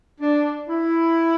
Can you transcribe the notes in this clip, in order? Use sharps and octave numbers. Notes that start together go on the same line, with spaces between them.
D4
E4